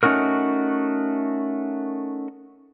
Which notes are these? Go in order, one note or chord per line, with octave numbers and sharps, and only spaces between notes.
A3 C#4 D#4 F#4 A#4